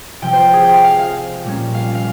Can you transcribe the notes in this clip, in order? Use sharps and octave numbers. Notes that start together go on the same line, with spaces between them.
C3 F3 C4 G5
C5
G#4
G5
F5
F5
F5
A#2 G3 A#3 C#4
F5
F5